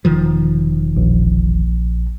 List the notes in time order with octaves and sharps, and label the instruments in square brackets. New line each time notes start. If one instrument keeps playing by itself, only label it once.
[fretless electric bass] E1 D#3 F3
[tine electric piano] A#1